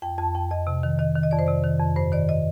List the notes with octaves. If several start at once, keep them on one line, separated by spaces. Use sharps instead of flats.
F2 G5
F2 A5
F2 G5
F2 D#5
C3
D#3
D#3 D#5
D#3
D#5
F2 D5
C5
C3 D5
D#3
F2
G2 C5
D#3 D5
D#5